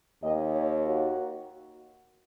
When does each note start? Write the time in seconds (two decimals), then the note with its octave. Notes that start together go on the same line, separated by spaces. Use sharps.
0.22 D#2 D#3 A#3 D#5
0.54 C#5
0.86 F#4